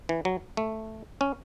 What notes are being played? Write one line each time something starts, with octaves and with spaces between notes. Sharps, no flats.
E3
F#3
A3
C#4